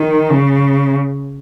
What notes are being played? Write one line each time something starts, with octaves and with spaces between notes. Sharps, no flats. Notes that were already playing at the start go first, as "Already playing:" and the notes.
Already playing: D#3
C#3